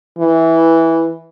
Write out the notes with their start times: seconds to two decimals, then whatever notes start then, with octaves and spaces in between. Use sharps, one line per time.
0.18 E3